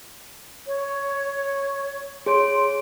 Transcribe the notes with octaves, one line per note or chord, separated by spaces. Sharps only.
C#5
G#4 C#5 C6 D7